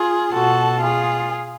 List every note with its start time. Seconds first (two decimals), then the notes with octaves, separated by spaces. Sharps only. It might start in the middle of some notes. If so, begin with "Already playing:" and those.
Already playing: F4 G#4
0.33 B2 F#4 A4
0.81 F4 G#4